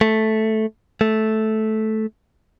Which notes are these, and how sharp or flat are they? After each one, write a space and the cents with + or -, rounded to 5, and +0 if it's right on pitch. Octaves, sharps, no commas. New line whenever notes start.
A3 -5
A3 -10